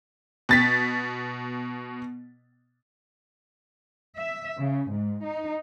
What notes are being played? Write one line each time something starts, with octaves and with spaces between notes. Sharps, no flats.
B2 A6 B6
E5
C#3
G#2
D#4